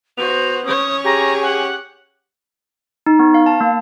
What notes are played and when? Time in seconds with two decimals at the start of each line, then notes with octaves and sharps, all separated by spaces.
0.18 B3 F#4 C5 F7
0.65 C#4 C#5 D#6
1.05 G4 G#4 A#5
1.42 F#5
3.06 D#4
3.19 B3
3.34 F5
3.46 A5
3.61 A#3